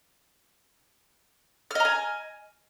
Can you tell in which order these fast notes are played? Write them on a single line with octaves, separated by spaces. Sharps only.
F6 D#5 A#5 G#5